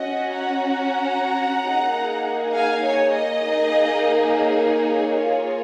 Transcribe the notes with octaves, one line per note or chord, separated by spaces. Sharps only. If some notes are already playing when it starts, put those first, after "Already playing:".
Already playing: C#4 F#4 D#5 F#5
F#5 A#5
A#3 D#4 G#4
F5 G#5
C#5
D#5
A#3 D#4 G#4
C#5
A#3 F4 G#4